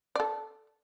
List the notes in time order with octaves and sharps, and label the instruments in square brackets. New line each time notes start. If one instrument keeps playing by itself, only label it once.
[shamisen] A4 D5